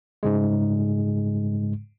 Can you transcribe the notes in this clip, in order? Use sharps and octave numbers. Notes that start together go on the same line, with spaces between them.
G#2 C#3 G#3